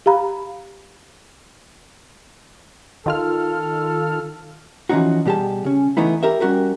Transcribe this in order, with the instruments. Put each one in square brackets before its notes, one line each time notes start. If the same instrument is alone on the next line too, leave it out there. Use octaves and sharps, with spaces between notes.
[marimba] G4 F5 A#5 B5
[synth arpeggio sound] D#3 F4 F6 [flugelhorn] A4
[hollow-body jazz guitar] E3 F3 A3 C#4 D#4 F#4
B2 G3 G4 G#4 A5
C#3 C#4
E3 A3 B3 D#4 E4
G4 A#4 E5
G3 C#4 F#4 G4 A#4